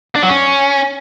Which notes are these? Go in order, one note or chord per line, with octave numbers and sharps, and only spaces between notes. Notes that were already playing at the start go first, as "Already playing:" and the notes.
D4
F#3
C#4